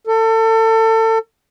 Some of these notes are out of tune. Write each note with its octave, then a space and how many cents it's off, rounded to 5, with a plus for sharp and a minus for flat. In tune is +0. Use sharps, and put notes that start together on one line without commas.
A4 +30